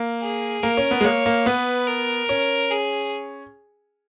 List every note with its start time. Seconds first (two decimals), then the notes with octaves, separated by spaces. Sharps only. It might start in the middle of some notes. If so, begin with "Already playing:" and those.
Already playing: A#3
0.22 G#4
0.63 A#3 A#4
0.77 C#4
0.91 B3
1.01 G#3
1.05 A#3 C#5
1.26 A#3
1.46 B3 B4
1.87 A#4
2.29 C#4
2.71 G#4